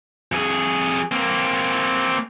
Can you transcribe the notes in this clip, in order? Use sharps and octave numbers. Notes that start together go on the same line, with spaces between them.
F2 G#4
A#3 C4